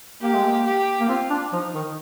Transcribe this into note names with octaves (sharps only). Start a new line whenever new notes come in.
A#3 G4
G#3
A#3
G4
A#3
C4 F4
D4
F3 D#4
D#3